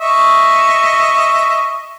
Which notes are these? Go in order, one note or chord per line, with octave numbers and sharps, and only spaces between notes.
D#5 E5 C#6